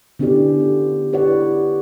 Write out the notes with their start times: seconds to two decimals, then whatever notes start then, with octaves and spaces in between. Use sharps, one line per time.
0.19 D3 B3 C#4 E4 G4 D5
0.60 F4
1.12 E4 G4 B4 C#5 D5 F#5
1.28 E4